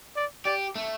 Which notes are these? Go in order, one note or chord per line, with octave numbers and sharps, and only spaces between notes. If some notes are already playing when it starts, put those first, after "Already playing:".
D5
G4 D5
A3